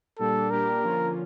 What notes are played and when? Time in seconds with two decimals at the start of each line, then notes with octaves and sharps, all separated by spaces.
0.19 A#2 G3 A#3 D4 G4 A4
0.51 A#2 G3 A#3 D4 G4 A#4
0.83 D3 F3 A#3 C#4 F4